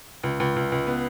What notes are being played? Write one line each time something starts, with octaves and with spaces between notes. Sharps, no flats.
C#2
C#2
C#2
C#2
B3